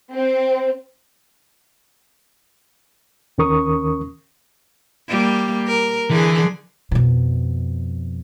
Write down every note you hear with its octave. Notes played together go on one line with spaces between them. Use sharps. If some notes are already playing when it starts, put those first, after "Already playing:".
C4
D#2 D#3 C#4 A#4 C#6 D#6
G3 A#3
A#4
D3 E3 G#4
F2 B2